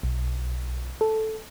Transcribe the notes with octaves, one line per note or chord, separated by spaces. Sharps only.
B1
A4